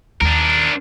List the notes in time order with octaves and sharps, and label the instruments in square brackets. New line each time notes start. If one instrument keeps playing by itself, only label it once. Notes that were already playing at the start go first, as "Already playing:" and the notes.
[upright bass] D#2 [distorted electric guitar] D4 A#4